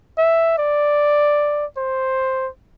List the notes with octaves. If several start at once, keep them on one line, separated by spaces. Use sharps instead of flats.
E5
D5
C5